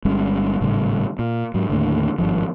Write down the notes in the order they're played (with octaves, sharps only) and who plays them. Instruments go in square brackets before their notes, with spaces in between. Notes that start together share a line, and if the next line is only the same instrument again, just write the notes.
[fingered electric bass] G1 G3 G#3 C#4
G#1 A2 C#3 G3
A#2
G#2 F#3
D#2 A2 D3
G#1 G2 F3